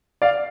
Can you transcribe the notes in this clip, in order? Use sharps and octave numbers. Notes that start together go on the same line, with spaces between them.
D5 F5